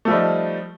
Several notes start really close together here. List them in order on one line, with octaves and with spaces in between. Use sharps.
A3 F3 G3 D#4